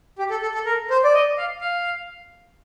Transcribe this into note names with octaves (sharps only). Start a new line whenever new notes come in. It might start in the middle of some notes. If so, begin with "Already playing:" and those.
G4
A4
A4
A4
A#4
C5
D5
D#5
F5
F5